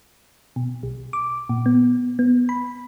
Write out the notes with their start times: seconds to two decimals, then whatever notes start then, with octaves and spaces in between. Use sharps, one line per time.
0.56 B2
0.83 B1
1.13 D6
1.49 A#2
1.66 B3
2.19 B3
2.49 B5